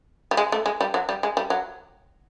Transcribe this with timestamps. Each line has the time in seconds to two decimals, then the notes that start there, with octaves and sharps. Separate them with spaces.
0.31 G3
0.37 G#3
0.52 A3
0.66 G#3
0.81 G3
0.94 F#3
1.09 G3
1.23 G#3
1.37 G3
1.50 F#3